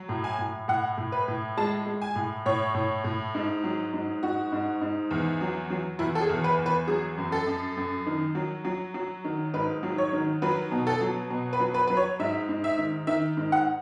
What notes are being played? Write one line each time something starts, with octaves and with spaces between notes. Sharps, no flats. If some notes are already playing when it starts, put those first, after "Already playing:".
Already playing: F#3
A2
G#5
A2
A2 F#5
A2
B4
A2
G#3 A5
G#3
G#5
A2
A2 C#5
A2
A2
G#2
F#3
G#2
G#2 F#4
G#2
G#2
E2
F#3
F#3
E2 E4
A4
G#4
E2
B4
E2
B4
F#3 G#4
F#2
A4
F#2
F#2
D#3
F#3
F#3
F#3
D#3
G#2 B4
F#3
C#5
D#3
F#3 B4
B2
A4
F#3
B2
B4
F#3
B4
F#3 B4
C#5
G#2 E5
G#2
E5
D#3
D#3 E5
G#2
F#5